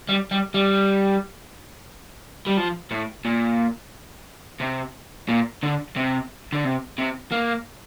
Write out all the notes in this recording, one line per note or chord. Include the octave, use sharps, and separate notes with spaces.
G3
G3
G3
G3
F3
A2
A#2
C3
A#2
D3
C3
D3
C3
C3
A#3